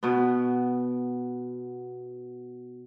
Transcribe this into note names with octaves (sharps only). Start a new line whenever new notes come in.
B2 B3